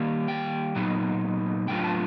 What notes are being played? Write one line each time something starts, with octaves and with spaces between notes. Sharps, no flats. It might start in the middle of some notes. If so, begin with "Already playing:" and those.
Already playing: D#3 G3 A#3
G5
A#2 F#3 B3 D#4
A2 F#3 B3 D4 F4 G5
A5